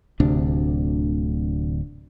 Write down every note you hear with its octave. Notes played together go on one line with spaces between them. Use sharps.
D1 D2 C3 D4